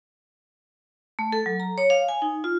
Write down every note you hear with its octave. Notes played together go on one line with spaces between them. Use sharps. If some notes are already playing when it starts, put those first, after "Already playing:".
A3
A4
F#3
A#5
C#5
F5
G#5
D#4
F4